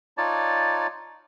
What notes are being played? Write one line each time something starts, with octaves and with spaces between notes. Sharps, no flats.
D#4 F4 C#5 D5 A5